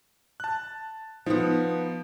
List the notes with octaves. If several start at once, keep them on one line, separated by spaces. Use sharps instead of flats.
A5 F#6
F3 B3 D#4